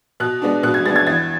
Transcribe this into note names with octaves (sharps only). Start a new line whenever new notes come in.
B2 F#6
G#3 B3 D4
B2 F#6
G#6
G#3 B3 D4 A6
G#6
E2 A6